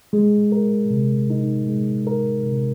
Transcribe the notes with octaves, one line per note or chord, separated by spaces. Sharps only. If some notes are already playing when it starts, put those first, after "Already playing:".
G#3
A#4
C3
D#4
G#3
A#4
C3